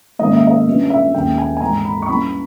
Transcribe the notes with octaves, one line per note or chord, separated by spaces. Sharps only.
G#2 D#3 A#3 C#4 D#5
E5
D#5
G1 G2 G3 C#4
E5
D#2 D#3 G#3 C#4 G5
G#5
G#5
G#1 G#2 E3 A#5
B5
C#6
G2 G3 C#4 E4 B5